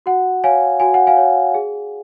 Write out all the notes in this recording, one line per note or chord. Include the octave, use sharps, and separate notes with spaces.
F#4 F#5
C#5 F5 G#5
F#4 G#5
F#5
F5 G#5
C#5
G#4